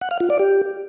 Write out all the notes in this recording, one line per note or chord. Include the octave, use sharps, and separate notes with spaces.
F#5
F5
F4
D5
G4